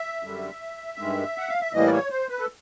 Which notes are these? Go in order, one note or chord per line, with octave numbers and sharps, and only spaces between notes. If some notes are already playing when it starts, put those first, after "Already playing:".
Already playing: E5
F#2 D3 G3
G2 D#3 G#3
F#5
F5
E5
A2 E3 G3 A#3 D#5
D5
C#5
C5
B4
A4